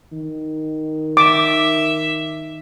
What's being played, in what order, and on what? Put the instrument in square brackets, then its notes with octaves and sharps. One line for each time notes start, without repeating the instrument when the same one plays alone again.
[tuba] D#3
[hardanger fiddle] E5 [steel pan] D6